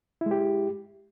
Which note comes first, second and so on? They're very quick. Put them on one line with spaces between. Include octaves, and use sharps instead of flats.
E4 G#3 G4